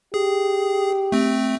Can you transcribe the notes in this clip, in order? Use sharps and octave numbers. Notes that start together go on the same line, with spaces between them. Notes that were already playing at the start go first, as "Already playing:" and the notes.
G4 G#4
A3 C4